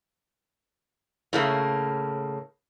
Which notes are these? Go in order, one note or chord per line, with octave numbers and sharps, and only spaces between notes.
A2 C#3 A#3